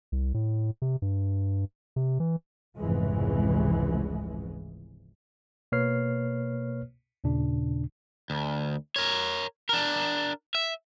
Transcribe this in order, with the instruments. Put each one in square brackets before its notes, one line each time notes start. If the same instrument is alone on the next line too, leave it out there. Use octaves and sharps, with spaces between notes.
[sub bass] C2
A2
C3
G2
C3
E3
[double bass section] F1 C#2 G#2 C#3 E3 G#3
[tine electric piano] B2 A#3 B4 C#5 F6 C7
D#2 A#2 C#3 D4
[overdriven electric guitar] D2
A#4 C#5
D4 A#4
E5